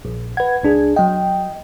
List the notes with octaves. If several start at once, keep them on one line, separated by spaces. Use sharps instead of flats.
A#1
B4 F#5 G#6
C#2 D4 G#4
F#3 D#5 G5